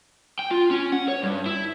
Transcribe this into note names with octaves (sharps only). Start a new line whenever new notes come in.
G5
F4
C#4
F#5
C#5
G2
E4